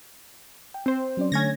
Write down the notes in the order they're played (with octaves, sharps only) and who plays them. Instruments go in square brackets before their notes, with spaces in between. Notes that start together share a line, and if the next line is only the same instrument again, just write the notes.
[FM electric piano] G5
[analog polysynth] C4 C5
[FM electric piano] F#3 C#4 D5
[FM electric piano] D3 A3 [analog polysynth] C#4 G#6 A#6